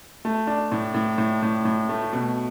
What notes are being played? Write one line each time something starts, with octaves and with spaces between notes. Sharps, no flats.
A3
D4
A2
A2
A2
A2
A2
A3
B2